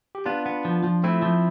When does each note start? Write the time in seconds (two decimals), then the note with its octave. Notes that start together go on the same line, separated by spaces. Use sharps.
0.15 G4
0.25 B3 D4 F4
0.46 B3
0.65 F3
0.84 F3
1.04 A3 C4 E4
1.22 F3